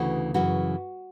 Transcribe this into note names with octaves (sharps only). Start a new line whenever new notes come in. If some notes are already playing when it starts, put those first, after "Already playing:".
Already playing: D2 C#3 E3 F#4
F#2 C#3 E3 F#4